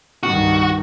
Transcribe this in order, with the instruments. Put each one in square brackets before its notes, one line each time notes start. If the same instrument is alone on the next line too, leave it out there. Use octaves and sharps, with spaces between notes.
[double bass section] C2 G2 D#3 [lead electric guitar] F#4